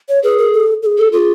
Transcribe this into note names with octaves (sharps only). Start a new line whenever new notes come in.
C#5
G#4 B4
A#4
A4
A4
G#4
A4
F4 G#4 A4